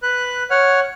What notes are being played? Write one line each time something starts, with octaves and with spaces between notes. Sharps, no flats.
B4 F#6
C#5 F#5 F6